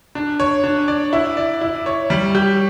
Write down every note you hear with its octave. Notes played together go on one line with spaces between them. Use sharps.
D4
C#5
D4
D5
E4
D5
E4
C#5
G3
G4